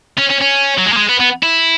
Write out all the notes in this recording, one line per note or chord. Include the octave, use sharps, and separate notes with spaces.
C#4
C#4
C#4
F#3
G#3
A#3
G#3
B3
B3
E4